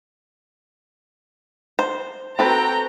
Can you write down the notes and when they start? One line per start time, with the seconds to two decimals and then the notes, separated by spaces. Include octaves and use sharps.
1.79 C5
2.39 C4 F#4 A4 B4 G5 A#5